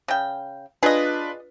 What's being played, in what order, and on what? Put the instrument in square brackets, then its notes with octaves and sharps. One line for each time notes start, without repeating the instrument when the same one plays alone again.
[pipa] C#3 G5
[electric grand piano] D4 F4 B4 [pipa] G#4 D#5